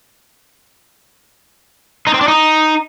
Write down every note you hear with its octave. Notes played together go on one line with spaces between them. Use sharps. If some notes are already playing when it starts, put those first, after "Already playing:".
D#4
C4
D4
D#4